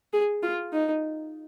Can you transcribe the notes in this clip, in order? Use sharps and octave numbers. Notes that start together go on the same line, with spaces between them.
G#4
F4
D#4